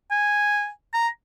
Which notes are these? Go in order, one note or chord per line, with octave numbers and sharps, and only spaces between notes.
G#5
A#5